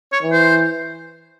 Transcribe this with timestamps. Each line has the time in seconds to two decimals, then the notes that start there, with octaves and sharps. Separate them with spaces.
0.13 C#5
0.23 E3
0.32 C5